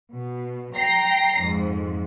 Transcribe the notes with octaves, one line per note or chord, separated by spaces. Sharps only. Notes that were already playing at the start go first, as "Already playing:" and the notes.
B2
G5 A#5 A#6 C7
F2 G#2